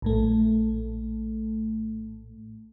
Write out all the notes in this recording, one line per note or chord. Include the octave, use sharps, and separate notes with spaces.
A#1 A2 A3